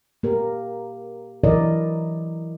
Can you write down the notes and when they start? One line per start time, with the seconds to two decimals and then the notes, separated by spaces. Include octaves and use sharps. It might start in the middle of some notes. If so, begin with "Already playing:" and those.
0.23 A#3 G4 A#4
1.44 E3 F#3 E4 A#4 D5 D#5